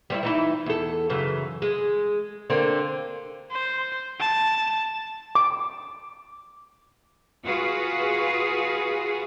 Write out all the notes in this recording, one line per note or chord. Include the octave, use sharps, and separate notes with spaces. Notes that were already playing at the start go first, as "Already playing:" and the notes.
G3 C4 E4
E3 D#4 E4
E2 A4
F#2 C#3 E3
G#3
D3 A#3 C4
C5
A5
D6
F4 F#4 G#4 B4